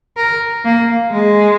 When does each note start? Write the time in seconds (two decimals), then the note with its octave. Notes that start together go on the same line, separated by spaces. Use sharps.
0.17 A#4
0.64 A#3
1.11 G#3